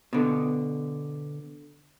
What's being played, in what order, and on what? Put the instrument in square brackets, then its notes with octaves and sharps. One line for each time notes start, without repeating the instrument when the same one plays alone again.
[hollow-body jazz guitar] B2 D3